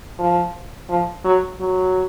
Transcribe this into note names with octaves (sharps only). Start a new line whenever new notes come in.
F3
F3
F#3
F#3